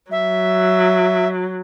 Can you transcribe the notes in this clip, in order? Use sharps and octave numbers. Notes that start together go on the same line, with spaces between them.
F#3 E5